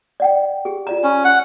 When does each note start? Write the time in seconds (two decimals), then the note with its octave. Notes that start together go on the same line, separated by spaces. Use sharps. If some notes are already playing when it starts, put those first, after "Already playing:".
0.20 D5 F#5 G5
0.65 G4 G#4
0.87 F4 D5 A#5
1.04 C#4 B5
1.24 F#5